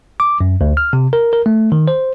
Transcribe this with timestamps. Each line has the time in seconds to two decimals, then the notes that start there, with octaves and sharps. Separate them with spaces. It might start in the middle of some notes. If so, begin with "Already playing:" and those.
0.20 D6
0.41 F#2
0.61 D2
0.77 F6
0.93 C3
1.13 A#4
1.33 A#4
1.46 A3
1.72 D#3
1.88 C5